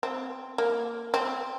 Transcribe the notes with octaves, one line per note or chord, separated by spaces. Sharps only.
C4
A#3
C4